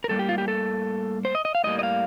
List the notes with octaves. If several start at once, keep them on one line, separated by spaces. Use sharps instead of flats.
A#4
A2 G3 A#3 A4
G4
F4
G4
A4
C5
D#5
D#5
F5
A2 G3 A#3 D#5
D#5
F5